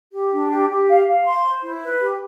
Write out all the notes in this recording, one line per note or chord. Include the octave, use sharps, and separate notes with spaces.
G4
D4
G4
G4
F5
F5
C6
C5
E4
B4
G4